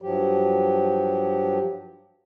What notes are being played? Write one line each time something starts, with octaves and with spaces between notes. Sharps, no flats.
G2 F3 F#3 G4